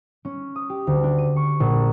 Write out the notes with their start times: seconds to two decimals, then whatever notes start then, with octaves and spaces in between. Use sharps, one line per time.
0.25 C#4
0.56 D#6
0.70 G4
0.87 D2
1.03 D4
1.18 D#7
1.36 C#6
1.60 A#1